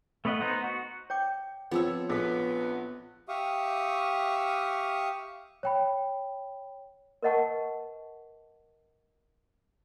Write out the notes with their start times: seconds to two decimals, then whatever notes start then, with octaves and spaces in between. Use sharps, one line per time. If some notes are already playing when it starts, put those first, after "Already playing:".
0.25 A3 B3 B4 D#5 F#5
0.41 B3 D#4 C5 F#5
0.64 F#4
1.10 C#5 G5 D6
1.71 F3 B3 C4 G#4 C#5 E6
2.10 A#1 B3 G#4 A4 B6
3.28 G4 E5 F5 C#6 D#6
5.63 C#5 G5 B5
7.23 A#4 B4 D#5 F#5 A5 C#6